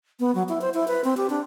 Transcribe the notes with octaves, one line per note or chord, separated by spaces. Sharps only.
B3
F#3
E4
C5
E4
B4
C4
G4
D4